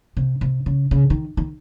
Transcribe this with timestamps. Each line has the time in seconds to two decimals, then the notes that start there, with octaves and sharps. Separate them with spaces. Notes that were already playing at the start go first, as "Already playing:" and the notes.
0.17 C3
0.41 C3
0.66 C#3
0.91 C#3
1.10 D#3
1.37 D#3